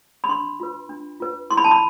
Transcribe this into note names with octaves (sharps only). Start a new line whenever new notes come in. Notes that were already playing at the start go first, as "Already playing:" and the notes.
B5
D4 C6
F4 B4
D4
F4 B4
E4 C6
B5
A5
B5